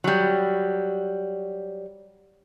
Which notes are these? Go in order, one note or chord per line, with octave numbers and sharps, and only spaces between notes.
F#3 G3